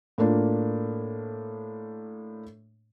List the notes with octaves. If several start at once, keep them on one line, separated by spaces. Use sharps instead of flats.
A2 A#3 D4 F4